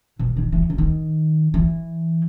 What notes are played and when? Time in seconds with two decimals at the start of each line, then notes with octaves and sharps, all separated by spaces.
0.19 B2
0.37 D#3
0.52 E3
0.70 C#3
0.78 D#3
1.54 E3